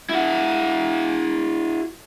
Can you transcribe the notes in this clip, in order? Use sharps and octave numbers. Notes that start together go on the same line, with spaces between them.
E4 F#4